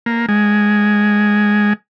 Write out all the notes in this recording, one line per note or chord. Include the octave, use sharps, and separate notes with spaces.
A#3
G#3